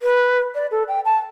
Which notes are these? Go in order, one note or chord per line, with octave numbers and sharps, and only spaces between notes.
B4
D5
A4
G5
A5